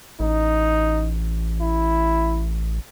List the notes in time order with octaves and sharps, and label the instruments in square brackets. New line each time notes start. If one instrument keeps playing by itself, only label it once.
[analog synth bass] A1 [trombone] D#4
[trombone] E4